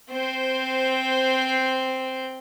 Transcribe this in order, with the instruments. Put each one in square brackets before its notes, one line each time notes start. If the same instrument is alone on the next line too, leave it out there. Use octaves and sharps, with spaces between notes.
[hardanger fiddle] C4 C5